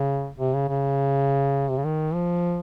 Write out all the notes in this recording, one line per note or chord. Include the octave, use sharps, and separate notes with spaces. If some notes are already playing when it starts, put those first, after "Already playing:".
Already playing: C#3
C3
C#3
C#3
C3
C#3
D#3
F3